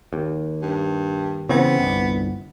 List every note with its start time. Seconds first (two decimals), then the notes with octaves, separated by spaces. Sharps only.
0.13 D#2
0.62 G2
1.49 C#3 E3 B3 C4
1.79 G1 C2